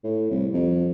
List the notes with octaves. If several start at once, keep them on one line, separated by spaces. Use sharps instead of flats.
A2
C2
F2